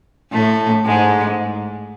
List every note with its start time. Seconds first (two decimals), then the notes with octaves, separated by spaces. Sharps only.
0.32 A2 A3
0.85 G#2 G#3